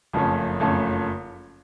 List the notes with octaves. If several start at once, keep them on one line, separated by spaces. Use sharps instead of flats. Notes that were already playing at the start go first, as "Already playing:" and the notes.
F#1 F2 F3 A3 C#4
F#1 F2 F3 A3 C#4